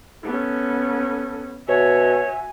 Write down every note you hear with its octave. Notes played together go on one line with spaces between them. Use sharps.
B3 C#4 A4
B2 F#4 C#5 E5 G#5